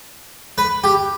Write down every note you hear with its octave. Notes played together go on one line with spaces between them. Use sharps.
B4
G4